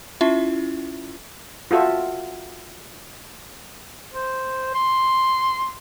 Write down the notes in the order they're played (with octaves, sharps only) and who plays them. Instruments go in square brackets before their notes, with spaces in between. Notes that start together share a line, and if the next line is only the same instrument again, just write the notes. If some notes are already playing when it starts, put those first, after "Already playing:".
[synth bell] C#4 E4 F4 E5
[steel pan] F4 F#4 A4 E5
[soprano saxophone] C5
C6